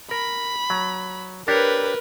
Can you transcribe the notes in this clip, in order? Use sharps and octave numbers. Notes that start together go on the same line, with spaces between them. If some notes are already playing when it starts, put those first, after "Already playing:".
A#4 B5
F#3
D4 G4 A#4 B4 C#5